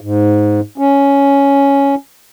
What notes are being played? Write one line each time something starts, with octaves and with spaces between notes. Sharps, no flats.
G#2
C#4